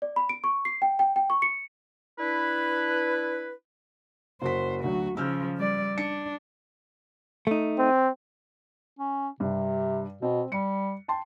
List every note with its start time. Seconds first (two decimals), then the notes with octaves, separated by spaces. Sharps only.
0.02 D5
0.16 B5
0.29 D7
0.44 C#6
0.65 C7
0.82 G5
0.99 G5
1.16 G5
1.30 C#6
1.42 C#7
2.19 D4 E4 B4
4.42 F#1 F#4 C5 B6
4.84 D2 F#3 F#4
5.17 C#3 F3 E6 F6 G6
5.57 G3 D5
5.98 D4 C#7
7.47 A3 D#4
7.78 C4
8.99 C#4
9.40 G2 C3
10.22 B2 C4
10.52 G3 C#7
11.08 G5 A5 C6